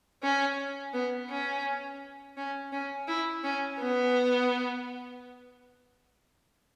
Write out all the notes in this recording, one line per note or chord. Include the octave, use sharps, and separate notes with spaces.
C#4
B3
C#4
C#4
C#4
E4
C#4
B3